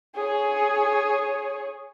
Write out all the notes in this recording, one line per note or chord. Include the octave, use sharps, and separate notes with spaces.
G#4 C#5